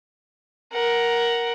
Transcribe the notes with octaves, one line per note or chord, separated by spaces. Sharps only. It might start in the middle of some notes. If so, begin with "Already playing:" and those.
A#4 F#5